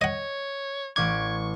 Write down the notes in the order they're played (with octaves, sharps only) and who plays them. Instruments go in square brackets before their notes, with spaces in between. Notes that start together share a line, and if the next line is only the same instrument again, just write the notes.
[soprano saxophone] C#5 [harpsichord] D#5 F#5
[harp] A1 D6 [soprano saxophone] C#6 [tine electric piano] G#6